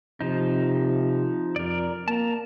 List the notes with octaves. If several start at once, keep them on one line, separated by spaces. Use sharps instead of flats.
C3 F3 D#4
F2 A#4 D5
A#3 A5 A#5